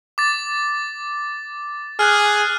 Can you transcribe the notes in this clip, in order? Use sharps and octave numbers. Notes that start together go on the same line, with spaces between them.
D6 A6
G#4 F6 F#6